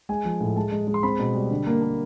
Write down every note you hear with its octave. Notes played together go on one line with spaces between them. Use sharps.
G#3 G#5
F3
A2
G#3 A5
G#3
G#3
C6
C4 B5
B2
G3
D3
A#3
A#3